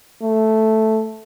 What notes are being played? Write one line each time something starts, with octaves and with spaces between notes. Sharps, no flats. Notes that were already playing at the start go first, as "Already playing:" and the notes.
A3